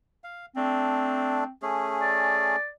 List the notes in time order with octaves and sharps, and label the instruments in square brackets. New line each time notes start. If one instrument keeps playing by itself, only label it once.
[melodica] F5
[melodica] A3 D4 [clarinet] C4
[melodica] A3 C#4 G#4
[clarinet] D5